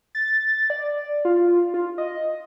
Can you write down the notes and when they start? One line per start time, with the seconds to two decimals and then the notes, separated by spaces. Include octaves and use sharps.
0.15 A6
0.70 D5
1.25 F4
1.74 F4
1.98 D#5